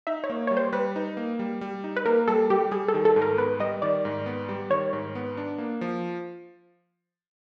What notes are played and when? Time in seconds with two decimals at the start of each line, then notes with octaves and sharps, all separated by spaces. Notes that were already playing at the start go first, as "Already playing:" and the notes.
0.07 D#4 E5
0.24 C#5
0.30 A#3
0.47 G3 C#5
0.57 C5
0.72 G3 B4
0.96 D#4
1.17 A#3
1.39 G3
1.61 G3
1.84 D#4
1.96 B4
2.06 A#3 A#4
2.28 G3 A4
2.50 G3 G4
2.71 G3 G#4
2.88 A4
2.94 D#3
3.05 A4
3.16 G#2
3.22 A#4
3.38 B3 B4
3.60 G3 D#5
3.82 D#3 D5
4.05 G#2
4.26 B3
4.49 G3
4.70 D#3 C#5
4.93 G#2
5.15 B3
5.37 D4
5.58 A#3
5.81 F3